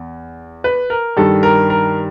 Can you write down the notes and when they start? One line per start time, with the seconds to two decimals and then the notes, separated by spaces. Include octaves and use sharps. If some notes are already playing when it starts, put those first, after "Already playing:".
Already playing: E2
0.64 B4
0.90 A#4
1.17 G2 D#3 G3 A4
1.43 A#4
1.70 A#4